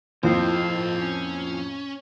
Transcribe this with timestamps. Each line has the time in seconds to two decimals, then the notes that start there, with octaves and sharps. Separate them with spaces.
0.23 F2 A2 F3 A#3 C4 C5 D#5
1.01 C#4